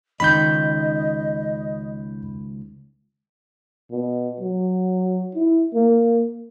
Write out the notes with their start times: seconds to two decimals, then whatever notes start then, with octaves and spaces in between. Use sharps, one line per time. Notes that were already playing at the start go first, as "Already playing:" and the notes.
0.20 C#2 D#3 D#5 B5 G6
3.91 B2
4.40 F#3
5.35 E4
5.74 A#3